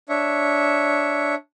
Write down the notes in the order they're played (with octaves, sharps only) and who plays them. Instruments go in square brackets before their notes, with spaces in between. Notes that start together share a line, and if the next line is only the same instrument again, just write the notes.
[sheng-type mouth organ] D4 C#5 E5